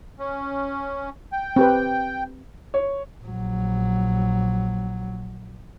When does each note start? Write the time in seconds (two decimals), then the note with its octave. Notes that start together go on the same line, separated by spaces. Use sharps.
0.19 C#4
1.32 G5
1.56 C4 G4 B4
2.74 C#5
3.24 A#1 F#3